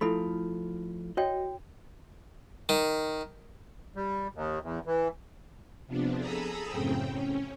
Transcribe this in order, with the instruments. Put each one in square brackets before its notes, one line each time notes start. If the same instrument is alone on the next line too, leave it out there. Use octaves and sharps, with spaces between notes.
[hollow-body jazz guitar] F3 A3 [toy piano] E4 A4 B5
[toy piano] F#4 C#5 G5 [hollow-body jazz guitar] D#5
[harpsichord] D#3
[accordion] G3
D#2
E2
E3
[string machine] C3 F3 B3 D4
G#4 A4 A#5 B5 D#6 E6
F#2 A2 C#3 C4 G5
C#4